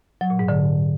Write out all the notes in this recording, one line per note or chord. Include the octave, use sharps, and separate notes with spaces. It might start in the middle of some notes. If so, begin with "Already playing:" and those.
F#3
A#2
G#2
D3